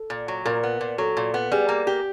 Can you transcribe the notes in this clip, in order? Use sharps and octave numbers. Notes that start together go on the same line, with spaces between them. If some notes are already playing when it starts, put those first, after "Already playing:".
Already playing: A4
A#2
F#3
A#2 A#4
B3
A#2
F#3 A4
A#2
B3
G3 G#4
A#3
G4